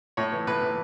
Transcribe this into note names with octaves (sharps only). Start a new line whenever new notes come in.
A2 C#5
E3
A2 B4
E3